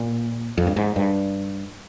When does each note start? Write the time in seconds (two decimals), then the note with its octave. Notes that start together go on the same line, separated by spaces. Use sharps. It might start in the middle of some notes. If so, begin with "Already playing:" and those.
Already playing: A#2
0.58 F2
0.67 G2
0.77 G#2
0.96 G2